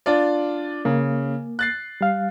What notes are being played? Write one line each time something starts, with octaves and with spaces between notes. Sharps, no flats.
D4 F4 D5
C#3 A#3
F#6 A6 C7
G3 F5